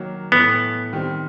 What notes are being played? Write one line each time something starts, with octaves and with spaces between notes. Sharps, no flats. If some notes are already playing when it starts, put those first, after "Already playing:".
Already playing: D#3 F#3 A#3
A2 E3 A3 B3
D#3 G3 C4